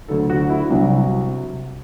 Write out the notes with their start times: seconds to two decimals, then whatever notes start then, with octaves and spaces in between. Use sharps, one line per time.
0.08 D2 D3 F#3 A4
0.30 F#4
0.50 E4
0.70 C2 C3 F#3 D4